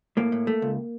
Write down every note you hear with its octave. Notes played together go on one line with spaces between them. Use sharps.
A2 A#3
A2
A3
C#2